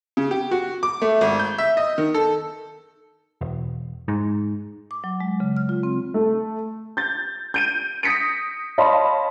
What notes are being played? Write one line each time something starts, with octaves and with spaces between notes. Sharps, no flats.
C#3
G4
F#4
D6
A3
G#1
G6
E5
D#5
D#3
A4
E1
G#2
D6
F#3
G#3
C#3
F6
F4
C4
A3
G6 A6
G6 D7 D#7
D#6 A#6 B6 C#7 D7
C#5 D#5 F5 A5 B5 C6